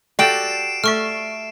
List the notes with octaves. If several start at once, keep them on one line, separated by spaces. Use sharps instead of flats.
F#4 G4 A4 D5 G5 C7 D7 E7
A3 A4 E5 C#6 F6